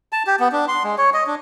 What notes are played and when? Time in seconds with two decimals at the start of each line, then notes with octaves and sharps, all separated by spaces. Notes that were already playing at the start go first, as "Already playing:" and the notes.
0.12 A5
0.27 G4
0.40 B3
0.52 D4
0.68 C6
0.84 G#3
0.98 C#5
1.14 D#5
1.27 D4